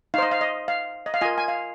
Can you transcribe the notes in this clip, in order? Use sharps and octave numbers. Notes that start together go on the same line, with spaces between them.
D#4 C5 D#5 F5
F5
D#5
F5
D#5
F5
F4 A#4 D#5 G#5
G#5
F5